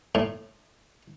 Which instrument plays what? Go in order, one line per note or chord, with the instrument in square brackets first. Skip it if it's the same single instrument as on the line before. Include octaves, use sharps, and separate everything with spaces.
[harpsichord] A2